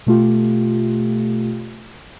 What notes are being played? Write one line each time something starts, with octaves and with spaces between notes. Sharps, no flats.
B2 A3 F4 G4